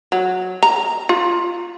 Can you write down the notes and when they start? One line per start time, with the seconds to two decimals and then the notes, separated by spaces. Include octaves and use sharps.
0.12 F#3
0.63 A#5
1.09 F4